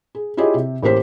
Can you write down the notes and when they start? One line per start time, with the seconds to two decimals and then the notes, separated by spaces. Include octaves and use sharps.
0.15 G#4
0.37 E4 F4 G4 G#4 C#5 D#5
0.54 C3
0.83 A1 A#3 G4 C5 B6